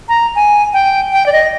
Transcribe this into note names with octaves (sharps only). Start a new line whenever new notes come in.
A#5
G#5
G5
G5
D5
D#5